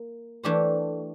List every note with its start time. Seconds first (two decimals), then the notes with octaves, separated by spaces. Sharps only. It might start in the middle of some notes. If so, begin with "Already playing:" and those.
Already playing: A#3
0.44 E3 A3 D4 G4 C5